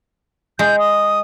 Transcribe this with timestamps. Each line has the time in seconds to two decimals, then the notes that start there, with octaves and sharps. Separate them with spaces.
0.59 G#3 G6
0.79 D#6